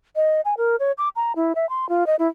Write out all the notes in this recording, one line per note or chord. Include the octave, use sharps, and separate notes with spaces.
D#5
G#5
A#4
C#5
D6
A#5
E4
E5
C6
F4
D#5
E4